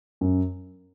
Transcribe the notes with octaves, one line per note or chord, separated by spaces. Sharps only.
F#2